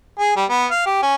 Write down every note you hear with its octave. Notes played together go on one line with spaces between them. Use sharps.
G#4
G3
B3
F5
G4
C#4